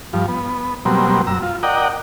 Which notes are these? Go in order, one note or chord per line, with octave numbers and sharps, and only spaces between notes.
G2 F3
B3
B2 F#3 G3 A#3 C4
F#2 A#5 E6
F4
A#4 D5 D#5 F#5 G5